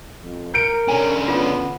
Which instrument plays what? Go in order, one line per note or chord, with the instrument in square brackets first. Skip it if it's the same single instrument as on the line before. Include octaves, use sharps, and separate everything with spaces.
[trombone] F2
[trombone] A#4 [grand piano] G6 C#7 D7
[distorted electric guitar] D3 C#4 [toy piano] G#5
[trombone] B3 [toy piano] F4